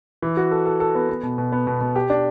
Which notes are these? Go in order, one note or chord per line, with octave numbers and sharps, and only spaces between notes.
E3
F#4
A4
A4
A4
B3
B3
B2
B2
B3
B2
B2
G4
D4